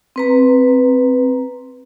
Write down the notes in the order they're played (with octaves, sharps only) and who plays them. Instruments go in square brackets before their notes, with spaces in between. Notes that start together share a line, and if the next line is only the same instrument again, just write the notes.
[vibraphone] C4 B4 A#5